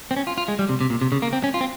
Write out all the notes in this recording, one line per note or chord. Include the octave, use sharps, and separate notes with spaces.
C4
C#4
F4
F4
G#3
G3
C3
C3
A#2
C3
C#3
A#3
C4
C#4
F4
C4